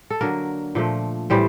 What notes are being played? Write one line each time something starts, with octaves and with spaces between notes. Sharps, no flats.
A4
D3 F#3 A#3 A#4
A#2 F3 A3
A2 E3 G3 C5